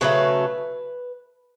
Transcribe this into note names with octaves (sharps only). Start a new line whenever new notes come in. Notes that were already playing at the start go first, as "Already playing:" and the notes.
C#3 F#3 A3 B4